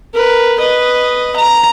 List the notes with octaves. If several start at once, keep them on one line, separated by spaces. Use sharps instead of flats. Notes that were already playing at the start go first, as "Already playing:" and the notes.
A#4 B4
B4 D#5
A#5